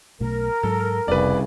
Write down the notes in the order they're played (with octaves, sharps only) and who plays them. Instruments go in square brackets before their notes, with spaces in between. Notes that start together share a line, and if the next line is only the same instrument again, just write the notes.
[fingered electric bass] B1 B2 A3 [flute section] A#4
[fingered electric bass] G#2 F#3 [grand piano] A4
[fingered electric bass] F1 [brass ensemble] C2 C#3 [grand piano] B4 D5